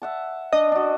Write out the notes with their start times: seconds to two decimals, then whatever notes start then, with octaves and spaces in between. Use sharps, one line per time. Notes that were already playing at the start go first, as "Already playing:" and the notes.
0.02 E5 F#5 A5
0.53 D4 D#5
0.72 D4 F#4